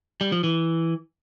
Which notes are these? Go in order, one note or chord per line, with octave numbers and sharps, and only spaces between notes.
G3
F3
E3